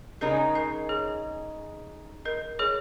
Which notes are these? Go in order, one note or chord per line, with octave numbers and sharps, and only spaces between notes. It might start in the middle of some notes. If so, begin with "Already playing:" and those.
C#3 G#3 D#4 A#4 D#5
A#4 D#5
G#4 C#5
A#4 D#5
G#4 C#5